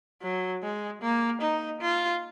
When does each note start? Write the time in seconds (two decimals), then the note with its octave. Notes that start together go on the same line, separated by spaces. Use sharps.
0.22 F#3
0.62 G#3
1.02 A#3
1.41 D#4
1.81 F4